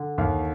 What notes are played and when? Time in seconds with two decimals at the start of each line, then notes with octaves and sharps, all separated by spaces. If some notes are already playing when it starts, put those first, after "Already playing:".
Already playing: D3
0.18 D#2 F5